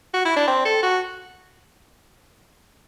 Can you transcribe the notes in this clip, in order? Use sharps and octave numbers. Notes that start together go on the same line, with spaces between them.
F#4
E4
D4
C4
A4
F#4